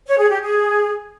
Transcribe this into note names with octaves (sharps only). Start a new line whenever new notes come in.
C#5
G#4
G4
G#4